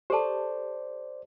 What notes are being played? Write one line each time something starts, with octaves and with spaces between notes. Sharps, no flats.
G4 A4 C5 D5 A5